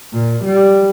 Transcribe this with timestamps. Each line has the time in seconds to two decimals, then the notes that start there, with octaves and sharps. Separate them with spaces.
0.13 A#2
0.45 G3